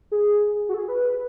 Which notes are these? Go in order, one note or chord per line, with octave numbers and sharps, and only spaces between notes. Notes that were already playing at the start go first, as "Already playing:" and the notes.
G#4
F#4
A4
G#4
B4